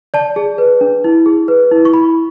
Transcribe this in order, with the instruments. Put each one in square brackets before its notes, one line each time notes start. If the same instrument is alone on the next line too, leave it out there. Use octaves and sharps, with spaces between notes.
[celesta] D5 A5
G#4
B4
D4
E4
G#4
B4
E4
C#6
E4 B5